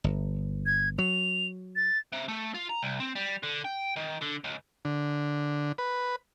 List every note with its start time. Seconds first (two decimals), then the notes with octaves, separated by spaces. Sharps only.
0.04 G1
0.66 G#6
0.98 F#3 F7
1.76 A6
2.13 C3
2.28 A3
2.55 F4
2.70 A#5
2.83 C2
3.00 C4
3.16 G3
3.43 D3
3.65 G5
3.96 D#3
4.21 D3
4.44 C#2
4.85 D3
5.78 B4